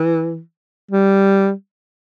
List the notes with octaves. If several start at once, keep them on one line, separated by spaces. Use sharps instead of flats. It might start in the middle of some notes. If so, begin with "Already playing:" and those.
Already playing: E3
G3